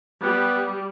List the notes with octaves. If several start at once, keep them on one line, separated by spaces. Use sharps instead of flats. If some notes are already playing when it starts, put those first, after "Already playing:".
G3 B3